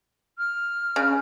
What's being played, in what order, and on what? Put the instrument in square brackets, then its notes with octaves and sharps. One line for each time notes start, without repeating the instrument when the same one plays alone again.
[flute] F6
[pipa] C#3